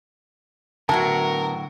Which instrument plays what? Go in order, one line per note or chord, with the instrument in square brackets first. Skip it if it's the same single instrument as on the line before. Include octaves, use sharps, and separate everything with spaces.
[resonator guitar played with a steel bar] A2 F#3 F#4 [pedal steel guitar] D3 B3 [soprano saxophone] A#4 [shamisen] A5